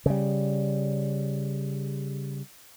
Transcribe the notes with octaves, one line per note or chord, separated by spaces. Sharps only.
C#3 G3